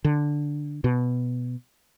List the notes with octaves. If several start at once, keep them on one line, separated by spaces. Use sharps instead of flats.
D3
B2